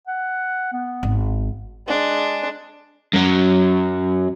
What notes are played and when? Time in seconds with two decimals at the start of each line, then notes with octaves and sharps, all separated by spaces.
0.07 F#5
0.73 B3
1.03 G#1
1.87 G#3 D4
3.13 F#2 F#3